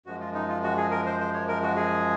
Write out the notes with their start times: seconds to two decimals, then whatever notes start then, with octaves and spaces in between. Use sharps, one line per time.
0.06 F#2 F3 G#3 F#4
0.20 F4
0.34 D#4
0.49 F4
0.63 F#4
0.77 G#4
0.91 A#4
1.06 C5
1.20 C5
1.34 C#5
1.48 A#4
1.63 F#4
1.76 G#4